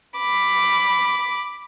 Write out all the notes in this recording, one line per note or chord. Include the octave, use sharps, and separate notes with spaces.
B5 D6